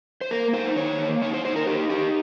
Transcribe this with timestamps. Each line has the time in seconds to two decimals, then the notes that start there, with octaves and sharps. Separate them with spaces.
0.21 C5
0.31 A#3 A#4
0.53 D#4 C5
0.76 D#3 C#5
0.99 A#3
1.22 D#4 C#5
1.34 C5
1.45 D#4 C5
1.56 A#4
1.67 D#4 G4
1.90 D#4 G4